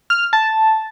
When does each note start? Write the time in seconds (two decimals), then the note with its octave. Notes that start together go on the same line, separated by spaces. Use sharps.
0.10 F6
0.33 A5